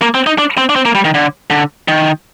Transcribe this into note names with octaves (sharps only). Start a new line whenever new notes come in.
A#3
C4
D#4
D4
C4
D4
C4
A#3
G3
D#3
D3
D3
D#3